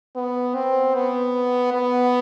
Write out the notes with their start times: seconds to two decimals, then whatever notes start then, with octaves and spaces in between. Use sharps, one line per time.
0.15 B3
0.55 C4
0.94 B3
1.73 B3